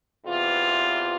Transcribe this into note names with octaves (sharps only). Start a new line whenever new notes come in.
E2 C3 E3 F4